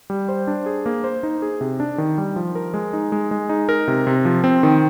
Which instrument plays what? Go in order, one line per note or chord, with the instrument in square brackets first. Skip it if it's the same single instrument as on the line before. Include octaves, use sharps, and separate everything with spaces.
[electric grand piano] G3
C5
D4
G#4
A#3
C5
D#4
G#4
C3
D4
D#3
G3
F3
A#4
G#3
D#4
G#3
G#3
D#4
A#4
C3
C3
F3
C4
D#3